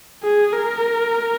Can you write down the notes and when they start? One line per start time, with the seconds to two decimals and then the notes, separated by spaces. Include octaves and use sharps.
0.24 G#4
0.53 A#4